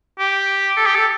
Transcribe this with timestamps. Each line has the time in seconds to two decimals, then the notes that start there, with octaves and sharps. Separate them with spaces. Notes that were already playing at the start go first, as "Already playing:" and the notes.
0.19 G4
0.77 A4
0.86 G4
0.95 A4